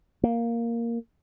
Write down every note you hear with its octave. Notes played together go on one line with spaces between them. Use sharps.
A#3